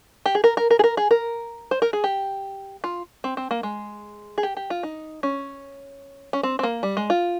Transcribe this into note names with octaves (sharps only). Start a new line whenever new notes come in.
G4
G#4
A#4
A#4
A#4
G#4
A#4
G#4
A#4
C5
A#4
G#4
G4
F4
C4
C4
A#3
G#3
G#4
G4
G4
F4
D#4
C#4
C#4
C4
C4
A#3
G3
G#3
F4